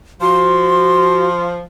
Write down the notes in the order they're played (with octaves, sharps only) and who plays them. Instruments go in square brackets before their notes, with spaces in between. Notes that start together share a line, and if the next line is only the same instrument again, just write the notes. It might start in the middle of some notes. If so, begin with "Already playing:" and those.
[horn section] F3 [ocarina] F#4 [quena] C6